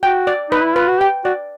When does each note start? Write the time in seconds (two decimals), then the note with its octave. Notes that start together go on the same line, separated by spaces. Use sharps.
0.03 F#4 G5
0.27 D5
0.50 D#4 B4
0.62 E4
0.75 F4 B4
0.88 F#4
1.00 G4 G5
1.25 F#4 D5